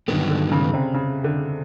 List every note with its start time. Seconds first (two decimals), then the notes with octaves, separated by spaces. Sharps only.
0.08 G2 D3 D#3 F#3 B3
0.30 D3
0.52 C#3
0.74 C3
0.94 C#3
1.24 D3